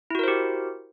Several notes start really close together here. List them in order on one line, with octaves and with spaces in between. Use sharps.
E4 F#4 A#4 C5 G4